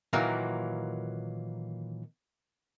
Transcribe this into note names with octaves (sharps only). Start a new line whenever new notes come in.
A#2 D#3 E3 F#3 A#3